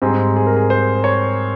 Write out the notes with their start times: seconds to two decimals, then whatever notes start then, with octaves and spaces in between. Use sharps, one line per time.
0.02 G#2 G3 C4 G#4
0.36 G#4
0.46 A#4
0.56 G#4
0.70 C5
1.04 C#5